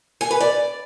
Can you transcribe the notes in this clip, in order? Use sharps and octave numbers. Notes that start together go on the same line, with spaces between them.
G#5
B4
D5